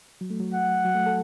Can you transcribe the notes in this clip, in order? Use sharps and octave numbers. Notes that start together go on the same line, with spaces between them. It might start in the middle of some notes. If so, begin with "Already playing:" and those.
F#3
A3
F#3
F#5
F#3
A3
A4